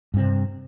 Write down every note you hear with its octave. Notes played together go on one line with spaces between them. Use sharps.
G2 C3 C4